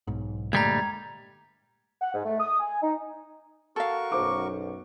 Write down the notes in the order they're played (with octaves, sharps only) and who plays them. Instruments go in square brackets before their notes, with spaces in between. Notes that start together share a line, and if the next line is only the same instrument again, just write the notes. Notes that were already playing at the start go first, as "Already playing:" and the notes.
[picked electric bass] B1 G#2
[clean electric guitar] D2 G3 [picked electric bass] G2 A#2 G#3 [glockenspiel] A#5 G#6
[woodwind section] F#5
G#2
A3
D#6
G#5
D#4
[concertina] F#4 A#4 C#6 [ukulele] A4 F5
[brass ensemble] B1 F#2 [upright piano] C5 D6